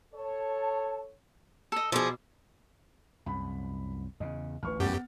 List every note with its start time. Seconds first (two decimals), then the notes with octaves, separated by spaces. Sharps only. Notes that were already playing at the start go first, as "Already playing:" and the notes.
0.14 A4 C#5 A5
1.72 A4 D#5
1.92 B2 F3 G#4 D5 C6 E6
3.26 C2 F#2 B5
4.20 E2 C#3 D#5
4.63 A1 D2 B4 C#6 F6
4.80 F#2 B3 G4 F#5 A6